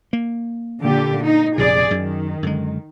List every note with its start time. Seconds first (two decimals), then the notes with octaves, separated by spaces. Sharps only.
0.13 A#3
0.80 A#2 D3 G4
1.23 D#4
1.58 A#1 F2 C3 G#4 D5
1.91 F#2 D#3
2.43 F#2 D3 G#3